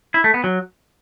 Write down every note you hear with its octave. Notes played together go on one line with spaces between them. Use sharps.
E4
A3
B3
F#3